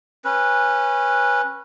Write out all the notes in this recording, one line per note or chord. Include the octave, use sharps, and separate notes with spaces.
C#4 B4